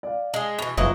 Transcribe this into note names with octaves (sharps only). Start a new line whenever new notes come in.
D5 F5
G#3 G#4
B2 E3 F7
F#1 F3 F#3 B3 E4 F4 D#5